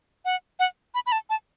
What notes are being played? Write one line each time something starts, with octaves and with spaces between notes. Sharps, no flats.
F#5
F#5
B5
B5
A5
A5